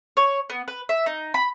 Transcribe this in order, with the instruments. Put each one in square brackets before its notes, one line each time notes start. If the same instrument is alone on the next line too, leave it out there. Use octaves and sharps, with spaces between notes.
[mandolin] C#5
B3
B4
E5
D#4
B5